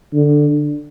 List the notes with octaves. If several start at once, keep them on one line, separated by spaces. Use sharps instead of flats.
D3